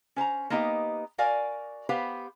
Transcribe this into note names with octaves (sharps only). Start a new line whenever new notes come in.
C#4 C5 A5 A#5
A#3 B3 D#4 G4 B4 D#5
F#4 A#4 D5 F5 G#5
B3 G4 B4 C5 F5